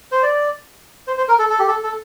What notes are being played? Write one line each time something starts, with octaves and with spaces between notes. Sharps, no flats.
C5
D5
C5
C5
A#4
A4
A4
G4
A4
A4